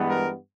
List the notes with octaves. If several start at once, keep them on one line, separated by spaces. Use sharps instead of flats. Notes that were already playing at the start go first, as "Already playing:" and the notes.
Already playing: G2 E3 G#3 B3
A#4